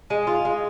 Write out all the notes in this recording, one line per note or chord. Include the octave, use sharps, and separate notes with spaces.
G#3
F4
G#3